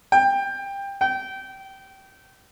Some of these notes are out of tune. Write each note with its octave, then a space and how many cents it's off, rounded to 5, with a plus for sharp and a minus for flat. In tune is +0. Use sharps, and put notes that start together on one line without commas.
G5 +20
G5 -20